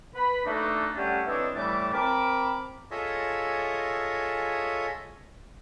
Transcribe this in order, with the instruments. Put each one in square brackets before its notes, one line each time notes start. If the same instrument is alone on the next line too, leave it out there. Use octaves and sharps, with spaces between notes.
[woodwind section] B4 B5
A3 A#3 D4 D#4 F#4 A4
G3 A3 C#4 D4 G4 F#5
E3 C4 D4 A4 C#5 D#5
A2 E3 G3 A3 A5 D6
C4 A#4 A5 B5 D6
[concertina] F4 G#4 A4 C#5 D#5 E5